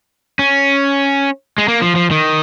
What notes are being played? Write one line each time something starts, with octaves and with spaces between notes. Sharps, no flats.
C#4
G#3
A#3
F3
F3
D#3